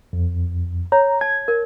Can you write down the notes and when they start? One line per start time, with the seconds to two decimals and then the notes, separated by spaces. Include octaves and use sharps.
0.13 F2
0.92 C#5 A#5
1.21 A5 G#6
1.48 A#4